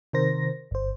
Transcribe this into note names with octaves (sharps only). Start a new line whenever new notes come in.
C3 D#3 A#4 C5 A#6
G1 C5